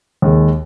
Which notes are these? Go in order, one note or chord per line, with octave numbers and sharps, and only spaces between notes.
D#2 D#3 G#3